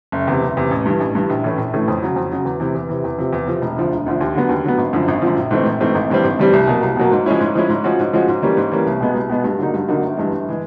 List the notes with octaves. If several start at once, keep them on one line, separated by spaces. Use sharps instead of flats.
F#1
E2 C3
F#1
E2 C3
A1
G2 E3
A1
G2 E3
A#1
A2 E3 A3 C#4
A#1
A2 E3 A3 C#4
F2
C#3 F#3
F2
C#3 F#3
E2
C3 E3
E2
C3 E3
E2
C3 F3
E2
C3 F3
E1
D2 D3 F3
E1
D2 D3 F3
D#2
D3 F#3 B3
D#2
D3 F#3 B3
G#1
F#2 D3 F3
G#1
F#2 D3 F3
A#1
G#2 E3 A3 C4
A#1
G#2 E3 A3 C4
G#1
G2 E3 G3 C4
G#1
G2 E3 G3 C4
C2
B2 F#3 A#3
C2
B2 F#3 A#3
G#2
F3 G#3 C#4 E4
G#2
F3 G#3 C#4 E4
G#2
F3 G#3 C#4 F#4
G#2
F3 G#3 C#4 F#4
G#2
E3 G3 A#3 C#4
G#2
E3 G3 A#3 C#4
C2
B2 G#3 B3
C2
B2 G#3 B3
G2
D3 F#3 A#3 D#4
G2
D3 F#3 A#3 D#4
G1
G2 E3 G#3
G1
E3 G#3